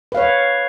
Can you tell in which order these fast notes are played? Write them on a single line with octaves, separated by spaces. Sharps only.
B4 F5 C#5